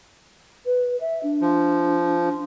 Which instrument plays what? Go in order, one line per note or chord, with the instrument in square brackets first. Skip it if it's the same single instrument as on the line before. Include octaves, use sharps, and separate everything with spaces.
[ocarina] B4
E5
D4
[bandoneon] F3